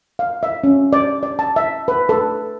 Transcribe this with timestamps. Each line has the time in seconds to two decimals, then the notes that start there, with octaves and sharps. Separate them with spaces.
0.19 F5
0.43 E5
0.64 C#4
0.93 D5
1.23 D5
1.39 A5
1.56 E5
1.88 B4
2.09 A4